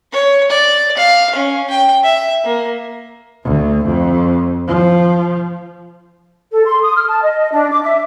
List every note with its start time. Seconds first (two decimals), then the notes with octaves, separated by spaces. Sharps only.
0.12 C#5
0.50 D5
0.97 F5
1.35 C#4
1.70 G5
2.04 E5
2.44 A#3
3.44 D2
3.85 F2
4.67 F3
6.52 A4
6.66 C6
6.83 D#6
6.96 F6
7.08 A5
7.23 D#5
7.39 D#5
7.52 D4
7.71 D6
7.83 E5